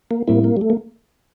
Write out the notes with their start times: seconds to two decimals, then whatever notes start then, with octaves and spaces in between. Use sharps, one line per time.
0.11 A#3
0.28 A2 G3 A#3 C4 E4
0.44 A#3
0.57 G3
0.61 A3
0.70 A#3